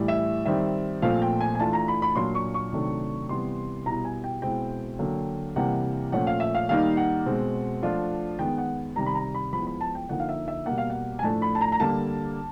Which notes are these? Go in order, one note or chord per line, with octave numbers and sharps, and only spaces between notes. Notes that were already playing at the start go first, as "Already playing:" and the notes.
Already playing: A2 E3 G3
E5
D#3 G3 C4 E5
A#2 F3 A3 C4 F5
G5
G#5
G#5
E3 A3 D4 F4 A5
A#5
B5
B5
A#2 F#3 A#3 D4 C6
C#6
C#6
C3 D#3 F#3 A3 D4
C3 E3 G3 B3 C6
B2 G3 B3 E4 A#5
G#5
G5
B2 G#3 C4 E4 G5
D3 F#3 A#3
C3 E3 G3 A#3 F#5
A#2 F3 A3 C#4 F#5
F5
E5
F5
D#3 G3 A#3 D#4 F5
F#5
B2 G#3 C4
F3 A3 D4 F4
D#3 G#3 B3 G5
F#5
C3 D#3 G3 A#5
B5
A#5
B5
F3 G#3 B3 E4 B5
B5
A5
G5
D3 F3 A#3 D#4 F#5
F5
E5
E5
B2 G3 A#3 F#5
F5
F#5
G#5
A2 F3 A3 D4 A5
B5
A5
A#5
A#5
D3 G3 A#3 A5